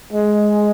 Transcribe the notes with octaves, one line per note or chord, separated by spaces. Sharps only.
G#3